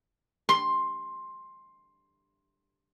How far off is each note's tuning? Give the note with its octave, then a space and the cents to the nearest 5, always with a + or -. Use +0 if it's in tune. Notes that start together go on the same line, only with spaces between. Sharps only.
C6 +10